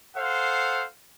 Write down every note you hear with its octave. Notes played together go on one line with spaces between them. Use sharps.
A4 C5 F5 F#5